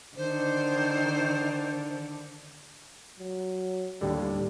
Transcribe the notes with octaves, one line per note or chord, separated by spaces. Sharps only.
D3 D#3 C5
F#3
D#2 A2 D3 G3